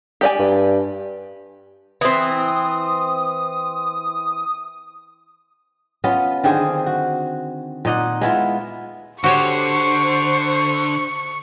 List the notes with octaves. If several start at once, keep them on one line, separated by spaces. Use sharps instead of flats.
G4 D5 G#5
G2
E3 C4 D#6
B3 C#4 F4 D#5
D3 D#3 C4 G#4
F#4
A#2 D#4 D#5 F#5
G#3 B3 E4 F4
D3 F#4 G4 C5 C#5 C#6